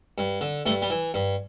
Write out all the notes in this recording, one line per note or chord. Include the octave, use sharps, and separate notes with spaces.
G2
D3
G2 A3
G3
E3
G2